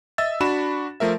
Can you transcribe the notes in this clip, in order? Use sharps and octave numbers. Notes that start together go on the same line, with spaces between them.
D#5 E5 E6 A6
D4 F#4 B5 E7
F3 A3 A#4 E5